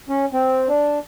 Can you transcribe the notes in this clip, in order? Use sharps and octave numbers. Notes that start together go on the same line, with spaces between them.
C#4
C4
D4